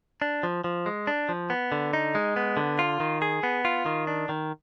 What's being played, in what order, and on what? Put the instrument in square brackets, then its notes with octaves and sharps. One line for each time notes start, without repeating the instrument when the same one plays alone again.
[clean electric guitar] D4
F3
F3
G#3
D4
F3
B3
D3
D#4
G#3
B3
D3
F4
D#3
G#4
B3
F4
D#3
D4
D#3